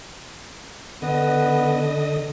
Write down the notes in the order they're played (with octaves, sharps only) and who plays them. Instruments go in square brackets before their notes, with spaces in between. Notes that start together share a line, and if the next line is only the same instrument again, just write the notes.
[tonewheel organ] D3 D#5 [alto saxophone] B3